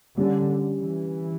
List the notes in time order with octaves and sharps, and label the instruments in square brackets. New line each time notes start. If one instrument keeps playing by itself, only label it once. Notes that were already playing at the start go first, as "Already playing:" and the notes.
[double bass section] D3 [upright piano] G3 C#4 G4
[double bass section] E3